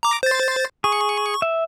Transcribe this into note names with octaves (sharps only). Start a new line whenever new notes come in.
A#5 D6
C5 A6
G#4 C#6
E5